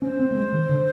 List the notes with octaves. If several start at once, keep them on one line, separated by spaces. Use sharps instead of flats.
C#4 C5
C4
A3
G#3
D#3
D3